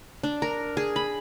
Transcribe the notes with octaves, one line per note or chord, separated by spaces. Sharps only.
D4
A#4
G#4
B5